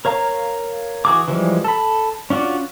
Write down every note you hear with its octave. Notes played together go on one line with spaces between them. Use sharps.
A#4 C#5 F5 A#5
E3 F#4 G#4 D6
E3 F3 G3 G#3
A4 B5
C#4 D4 F4 F#4 D5